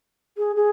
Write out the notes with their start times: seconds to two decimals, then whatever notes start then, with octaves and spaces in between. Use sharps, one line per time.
0.37 G#4
0.56 G#4